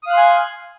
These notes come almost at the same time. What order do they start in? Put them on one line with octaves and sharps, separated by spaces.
D#6 F5 F#6 C6 G#5